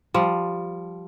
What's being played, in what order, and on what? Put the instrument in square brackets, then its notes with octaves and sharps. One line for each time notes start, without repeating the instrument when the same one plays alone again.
[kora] F3 G3